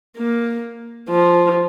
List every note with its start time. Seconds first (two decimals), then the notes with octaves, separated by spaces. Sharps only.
0.18 A#3
1.09 F3